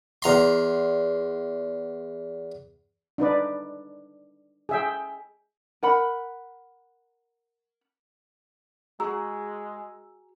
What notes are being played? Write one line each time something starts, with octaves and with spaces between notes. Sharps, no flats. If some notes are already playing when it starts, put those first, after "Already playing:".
E2 A#5 C6
D4 D#4 B4 D5
G#4 E5 G5
A#4 F#5 B5
G#3 F#4 G#4 A#5 E6